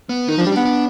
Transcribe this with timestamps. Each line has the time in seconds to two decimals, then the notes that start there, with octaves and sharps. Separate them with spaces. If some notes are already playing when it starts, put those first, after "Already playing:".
0.09 B3
0.28 D#3 D#4
0.37 F3
0.41 D4
0.46 G3
0.52 B3 D4
0.65 D4